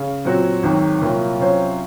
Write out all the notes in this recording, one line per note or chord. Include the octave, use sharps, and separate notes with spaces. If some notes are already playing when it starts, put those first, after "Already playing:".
Already playing: C#3
A#2 F#3 C4 F#4
G#1 G#2 D#3 F#3
C2 A#2 F#3 A#3 F4
C3 F#3 C#4 F4 C5